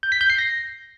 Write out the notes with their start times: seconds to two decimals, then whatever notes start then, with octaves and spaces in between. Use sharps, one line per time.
0.03 G6
0.12 B6
0.21 G6
0.30 C7
0.38 A#6